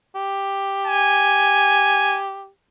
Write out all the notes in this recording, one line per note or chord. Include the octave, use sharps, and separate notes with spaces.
G4
G#5